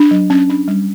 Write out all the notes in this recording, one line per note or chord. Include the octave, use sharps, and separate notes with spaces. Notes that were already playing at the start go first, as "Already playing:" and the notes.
Already playing: D4
F#3
C#4
D4
G3